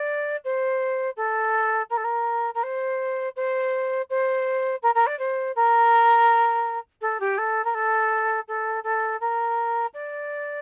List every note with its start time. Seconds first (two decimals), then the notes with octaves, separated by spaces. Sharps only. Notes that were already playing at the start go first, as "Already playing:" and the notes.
Already playing: D5
0.44 C5
1.16 A4
1.90 A#4
1.97 A4
2.04 A#4
2.54 A#4
2.63 C5
3.36 C5
4.10 C5
4.82 A#4
4.94 A#4
5.06 D5
5.18 C5
5.55 A#4
7.01 A4
7.20 G4
7.38 A4
7.64 A#4
7.74 A4
8.48 A4
8.83 A4
9.20 A#4
9.93 D5